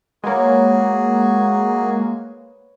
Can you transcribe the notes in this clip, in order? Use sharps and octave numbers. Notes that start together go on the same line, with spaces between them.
G#3 A#3 F#4 G#4 B4 C#5